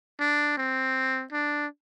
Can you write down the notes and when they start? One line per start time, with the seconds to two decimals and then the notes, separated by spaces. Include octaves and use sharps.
0.20 D4
0.57 C4
1.32 D4